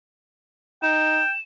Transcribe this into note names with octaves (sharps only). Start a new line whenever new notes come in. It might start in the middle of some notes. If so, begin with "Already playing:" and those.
D#4 G5 E7